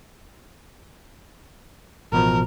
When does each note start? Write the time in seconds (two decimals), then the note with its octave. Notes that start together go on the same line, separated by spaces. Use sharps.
2.12 A1 B2 F3 A#4